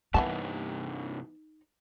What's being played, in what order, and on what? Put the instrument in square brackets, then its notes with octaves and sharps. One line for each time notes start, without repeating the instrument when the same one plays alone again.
[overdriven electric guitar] C2 G2 [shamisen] E3 B3 A5 [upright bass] D#4